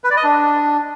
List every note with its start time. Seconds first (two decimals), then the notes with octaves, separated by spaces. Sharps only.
0.04 B4
0.10 D5
0.17 D#5
0.24 D4